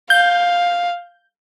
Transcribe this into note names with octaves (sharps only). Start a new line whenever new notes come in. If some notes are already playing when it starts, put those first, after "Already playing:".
F5 G6